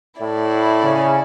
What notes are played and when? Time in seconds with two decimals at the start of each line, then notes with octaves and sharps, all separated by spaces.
0.21 A2 E4 D5
0.83 C#3 C#4